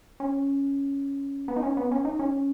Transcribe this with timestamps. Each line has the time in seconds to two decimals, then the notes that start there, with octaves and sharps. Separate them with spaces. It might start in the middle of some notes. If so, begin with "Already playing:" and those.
0.20 C#4
1.48 B3
1.56 D#4
1.63 C#4
1.77 B3
1.91 C#4
2.05 D#4
2.19 C#4